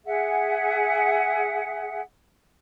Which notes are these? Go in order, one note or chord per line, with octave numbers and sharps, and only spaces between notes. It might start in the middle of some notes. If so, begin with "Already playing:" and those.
G#4 E5 F#5